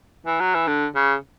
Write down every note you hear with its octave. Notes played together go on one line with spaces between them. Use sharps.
E3
F#3
E3
D3
C#3